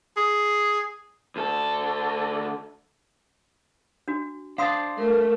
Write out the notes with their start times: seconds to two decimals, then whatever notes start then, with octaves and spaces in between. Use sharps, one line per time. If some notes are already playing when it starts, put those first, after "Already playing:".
0.17 G#4
1.36 D2 A4
4.08 D4 F#4
4.58 D4 C5 F5 A5 C6 D#6
4.98 A3 A#4